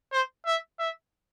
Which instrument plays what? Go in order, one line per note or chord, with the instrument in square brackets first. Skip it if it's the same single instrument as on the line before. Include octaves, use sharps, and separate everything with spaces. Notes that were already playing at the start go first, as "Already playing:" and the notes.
[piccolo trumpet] C5
E5
E5